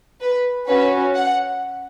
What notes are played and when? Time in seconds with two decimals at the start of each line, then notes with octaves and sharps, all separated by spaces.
0.21 B4
0.68 C#4 F#4 B4
1.15 F#5